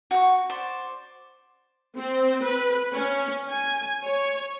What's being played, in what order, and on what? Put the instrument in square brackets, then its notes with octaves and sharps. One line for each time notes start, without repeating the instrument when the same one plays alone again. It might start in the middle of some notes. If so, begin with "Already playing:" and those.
[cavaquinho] F#4 C#6
C5 D5
[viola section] C4
B4
C#4
G#5
C#5